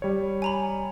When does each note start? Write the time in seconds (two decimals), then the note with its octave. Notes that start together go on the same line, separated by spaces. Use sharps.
0.02 G3 C#5
0.42 G#5 A#5 B5